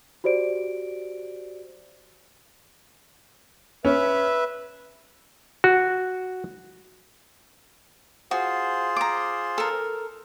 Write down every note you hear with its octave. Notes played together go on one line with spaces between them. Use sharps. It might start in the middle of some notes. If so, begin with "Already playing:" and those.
F#4 G4 C5 D5 D7
C#4 B4 E5
F#4
F4 F#4 G#4 C5
A#5 D6
A4 A#4